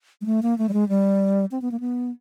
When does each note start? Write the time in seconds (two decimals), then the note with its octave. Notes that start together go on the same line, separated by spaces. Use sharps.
0.21 G#3
0.26 A3
0.43 A#3
0.58 A3
0.69 G3
0.73 G#3
0.89 G3
1.51 C4
1.62 B3
1.71 A#3
1.80 B3